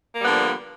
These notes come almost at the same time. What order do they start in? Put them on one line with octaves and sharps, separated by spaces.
A#3 G3 B3 D3 F3